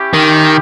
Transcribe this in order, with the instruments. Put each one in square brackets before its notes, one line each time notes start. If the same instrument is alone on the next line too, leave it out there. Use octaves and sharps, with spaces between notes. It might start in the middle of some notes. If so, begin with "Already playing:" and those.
Already playing: [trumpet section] C#4 E4 G4
[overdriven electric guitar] D#3